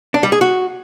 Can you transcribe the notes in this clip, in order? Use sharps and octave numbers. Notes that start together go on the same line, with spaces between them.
D4
G3
G#4
F#4